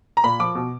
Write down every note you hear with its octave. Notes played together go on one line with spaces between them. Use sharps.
A#5
A#2 B5
F3 D6
B2